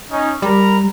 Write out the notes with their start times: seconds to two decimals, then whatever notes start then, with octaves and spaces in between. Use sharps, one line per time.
0.11 C#4 D#4
0.42 G3 A#4 A#5 B5